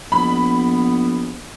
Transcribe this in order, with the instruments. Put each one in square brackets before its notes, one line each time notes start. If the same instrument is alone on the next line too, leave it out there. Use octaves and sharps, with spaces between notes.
[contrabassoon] A#1 [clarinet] B3 [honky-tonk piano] B5